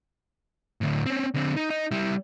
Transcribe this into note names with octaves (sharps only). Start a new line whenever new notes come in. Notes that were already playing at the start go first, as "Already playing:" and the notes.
D2 A2
C4 C#4
D3 C4
D#4
D#4
G3 E4